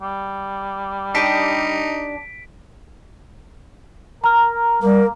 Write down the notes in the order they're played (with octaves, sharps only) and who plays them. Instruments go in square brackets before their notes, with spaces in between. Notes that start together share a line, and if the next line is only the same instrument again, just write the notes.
[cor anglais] G3
[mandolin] D4 G4 D#6 [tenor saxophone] D#4 [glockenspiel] B6 D7
[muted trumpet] A#4 [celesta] A#5 F6
[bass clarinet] G3 [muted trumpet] A#3 [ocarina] A#4